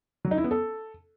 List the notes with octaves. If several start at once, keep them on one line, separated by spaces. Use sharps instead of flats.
F#3
D#4
E4
B3
A4